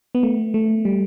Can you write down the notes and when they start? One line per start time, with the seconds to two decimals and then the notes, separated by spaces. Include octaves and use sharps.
0.15 B3
0.23 A3
0.54 A3
0.85 G3